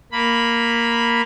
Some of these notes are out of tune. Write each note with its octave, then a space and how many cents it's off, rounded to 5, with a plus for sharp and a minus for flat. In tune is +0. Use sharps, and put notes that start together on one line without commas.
A#3 +0 B5 +0